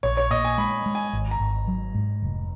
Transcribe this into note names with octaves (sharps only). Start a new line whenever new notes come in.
A#1 C#5
C#5
A#2 D#5
G#5
G#3 B5
G#3
G#5
G#1
A#5
G#1
F#3
G#2
F1